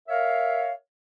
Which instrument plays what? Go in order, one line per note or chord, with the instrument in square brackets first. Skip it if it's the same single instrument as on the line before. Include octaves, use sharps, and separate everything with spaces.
[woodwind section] A#4 C#5 E5 F5